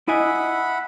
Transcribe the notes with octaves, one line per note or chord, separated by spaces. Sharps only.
E4 D#5 E5 F#5 G#5 B5